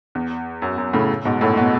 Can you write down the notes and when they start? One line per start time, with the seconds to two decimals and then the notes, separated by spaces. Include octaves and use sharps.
0.15 E2
0.62 F#2
0.78 F#2
0.93 A2 C#3
1.25 G#2 B2
1.41 F#2 A2
1.57 B2